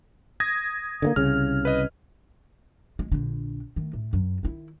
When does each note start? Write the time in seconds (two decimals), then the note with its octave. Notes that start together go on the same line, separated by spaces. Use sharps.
0.40 D#6 G#6 A#6
1.02 D3 D#3 A#3
1.16 C2 C#3 F6
1.65 B4 D#5
2.99 G#3
3.12 A#1 D3
3.76 D#3 A3
3.93 A2
4.13 F#2 F#3
4.43 D#3 E4